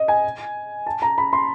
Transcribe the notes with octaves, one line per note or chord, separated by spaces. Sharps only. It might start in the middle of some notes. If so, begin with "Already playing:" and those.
Already playing: D#5
G#5
A5
A#5
B5
C6